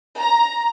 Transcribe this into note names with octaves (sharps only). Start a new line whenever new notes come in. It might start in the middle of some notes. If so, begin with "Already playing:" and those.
A#5